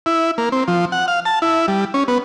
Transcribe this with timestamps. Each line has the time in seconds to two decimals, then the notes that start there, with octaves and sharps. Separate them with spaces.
0.06 E4
0.38 A#3
0.52 C4
0.68 F3
0.92 F#5
1.08 F5
1.25 A5
1.42 E4
1.68 G3
1.94 C#4
2.08 B3